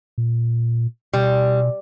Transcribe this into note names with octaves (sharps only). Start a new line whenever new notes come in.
A#2
B2 G3